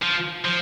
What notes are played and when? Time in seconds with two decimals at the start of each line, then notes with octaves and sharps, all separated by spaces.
0.02 F3
0.45 F3